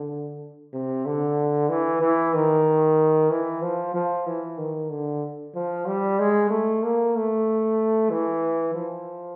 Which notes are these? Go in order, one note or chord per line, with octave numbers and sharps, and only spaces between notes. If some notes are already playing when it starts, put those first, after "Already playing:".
Already playing: D3
C3
D3
E3
E3
D#3
E3
F3
F3
E3
D#3
D3
F3
G3
G#3
A3
A#3
A3
E3
F3